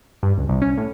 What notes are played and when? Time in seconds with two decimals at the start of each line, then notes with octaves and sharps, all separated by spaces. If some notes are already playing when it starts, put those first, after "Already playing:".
0.23 G2
0.38 C#2
0.49 C2
0.62 C#4
0.78 A2